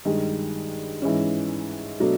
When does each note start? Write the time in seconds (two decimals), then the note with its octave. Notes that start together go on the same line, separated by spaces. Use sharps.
0.05 G2 D#3 G#3
1.02 G#2 E3 G#3 C#4
2.00 B2 F#3 A3 D4